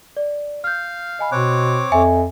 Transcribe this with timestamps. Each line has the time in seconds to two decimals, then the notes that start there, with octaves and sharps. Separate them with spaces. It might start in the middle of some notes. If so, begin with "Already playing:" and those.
0.17 D5
0.64 F5 F6 G6
1.19 D#5 G#5 B5
1.32 B2 C4 C#5 D6 F#6
1.92 F2 E5 G#5